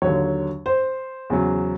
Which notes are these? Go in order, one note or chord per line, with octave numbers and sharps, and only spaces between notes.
D#2 D3 F#3 C#5
C5
E2 C#3 F#3